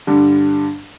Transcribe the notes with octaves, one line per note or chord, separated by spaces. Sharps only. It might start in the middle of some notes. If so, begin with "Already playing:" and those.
G2 D3 G3